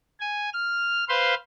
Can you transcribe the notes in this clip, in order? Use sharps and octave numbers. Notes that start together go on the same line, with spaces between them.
G#5
F6
B4 C5 F5 C6